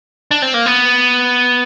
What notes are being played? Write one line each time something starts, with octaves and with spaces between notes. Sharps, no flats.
D4
C4
A#3
B3